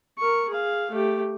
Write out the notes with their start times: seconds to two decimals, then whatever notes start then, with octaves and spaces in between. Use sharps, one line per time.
0.18 A#4 C#6
0.49 G#4 F5
0.91 A3 G4